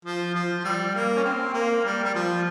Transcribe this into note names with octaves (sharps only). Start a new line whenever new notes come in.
F3
F3
F3
G3
A#3
C#4
C4
A#3
G3
G3
F3